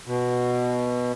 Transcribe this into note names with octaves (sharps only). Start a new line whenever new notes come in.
B2